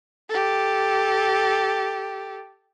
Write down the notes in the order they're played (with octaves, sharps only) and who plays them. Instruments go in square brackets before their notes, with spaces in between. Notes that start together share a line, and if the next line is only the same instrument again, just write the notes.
[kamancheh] G4 A4